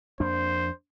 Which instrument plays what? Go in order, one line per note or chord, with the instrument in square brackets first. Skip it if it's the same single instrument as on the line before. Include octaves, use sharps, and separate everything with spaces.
[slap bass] F2 A#3 D4 [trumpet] C5